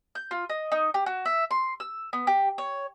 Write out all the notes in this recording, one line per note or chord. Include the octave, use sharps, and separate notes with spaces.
G6
F4
D#5
D#4
G4
F#4
E5
C6
E6
B3
G4
C#5